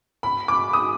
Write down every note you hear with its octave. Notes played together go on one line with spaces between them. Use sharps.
B5
D6
D#6